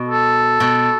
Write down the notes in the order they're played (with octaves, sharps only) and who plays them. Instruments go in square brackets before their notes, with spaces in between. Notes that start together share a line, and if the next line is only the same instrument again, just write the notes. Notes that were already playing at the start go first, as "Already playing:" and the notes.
Already playing: [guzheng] B2
[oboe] A4
[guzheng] B2